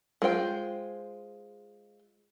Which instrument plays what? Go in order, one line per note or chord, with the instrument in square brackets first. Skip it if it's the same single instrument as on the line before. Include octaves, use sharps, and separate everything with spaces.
[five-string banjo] G#3 F4 C5 G5